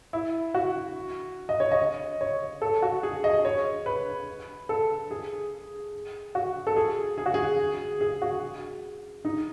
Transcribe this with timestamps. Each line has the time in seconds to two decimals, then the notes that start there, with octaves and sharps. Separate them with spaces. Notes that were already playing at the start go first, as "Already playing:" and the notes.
0.13 E4
0.54 F#4
1.49 D#5
1.60 C#5
1.72 D#5
2.21 C#5
2.62 A4
2.82 F#4
3.03 G#4
3.24 D#5
3.45 C#5
3.86 B4
4.69 A4
5.11 G#4
6.35 F#4
6.67 A4
6.76 G#4
7.18 G#4
7.26 F#4
7.34 G#4
8.01 G#4
8.22 F#4
9.25 D#4